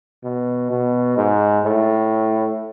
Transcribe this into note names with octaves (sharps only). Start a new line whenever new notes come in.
B2
B2
G#2
A2